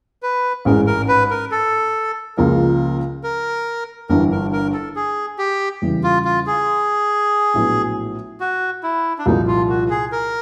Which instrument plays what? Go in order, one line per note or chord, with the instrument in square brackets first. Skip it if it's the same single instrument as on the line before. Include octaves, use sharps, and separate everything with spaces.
[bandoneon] B4
[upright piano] A1 G#2 E3 G#3 C#4 [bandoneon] A#4
[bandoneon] A#4
B4
A#4
A4
[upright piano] C#2 C#3 F3 A#3 [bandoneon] A#4
[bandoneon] A#4
[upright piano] G1 G2 E3 [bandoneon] A#4
[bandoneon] A#4
A#4
A4
G#4
G4
[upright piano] E2 C#3 E3 G3
[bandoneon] F4
F4
G#4
[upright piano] A#1 A2 F#3 B3
[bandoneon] F#4
E4
D4
[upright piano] C2 A#2 F3 [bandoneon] D#4
[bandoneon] F4
F#4
G#4
A#4